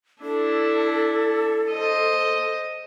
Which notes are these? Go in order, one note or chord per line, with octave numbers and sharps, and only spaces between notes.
D4 E4 A4
C5 D#5